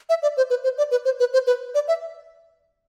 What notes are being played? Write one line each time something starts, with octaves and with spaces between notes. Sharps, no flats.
E5
D5
C5
B4
C5
D5
B4
C5
B4
C5
B4
D5
E5